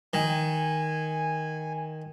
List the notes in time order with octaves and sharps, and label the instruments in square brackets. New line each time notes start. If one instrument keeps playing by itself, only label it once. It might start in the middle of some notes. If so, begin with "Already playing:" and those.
[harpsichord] D#3 [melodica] G#5